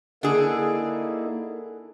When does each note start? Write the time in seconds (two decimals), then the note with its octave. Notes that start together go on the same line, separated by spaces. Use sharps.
0.23 D3 A#3 D#4 E4 G#4